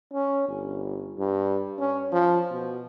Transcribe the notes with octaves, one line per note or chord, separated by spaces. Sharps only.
C#4
G1
G2
C#4
F3
B2